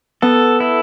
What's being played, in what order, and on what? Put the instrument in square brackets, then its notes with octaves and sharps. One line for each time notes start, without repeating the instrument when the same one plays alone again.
[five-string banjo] B3 [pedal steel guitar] A4
[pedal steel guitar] E4